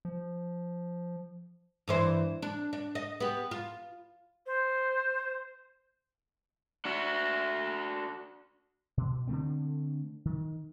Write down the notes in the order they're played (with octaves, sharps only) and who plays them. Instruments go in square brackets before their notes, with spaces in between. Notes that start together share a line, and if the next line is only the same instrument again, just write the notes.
[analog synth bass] F3
[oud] G2 E3 C5
D4
D4
D#5
B3 G4
F4
[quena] C5
[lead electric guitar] D4 F#4
[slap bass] B2
D3 E3 A3 C4
D#3